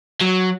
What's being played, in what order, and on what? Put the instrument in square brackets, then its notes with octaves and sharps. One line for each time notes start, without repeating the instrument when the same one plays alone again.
[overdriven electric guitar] F#3